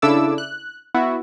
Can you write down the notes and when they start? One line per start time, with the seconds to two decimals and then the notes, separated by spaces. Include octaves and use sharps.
0.02 C#3 D4 E4 A4 D6 E6
0.38 F#6
0.94 B3 E4 F#4